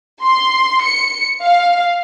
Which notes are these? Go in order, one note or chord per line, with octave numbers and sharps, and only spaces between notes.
C6
C#7
F5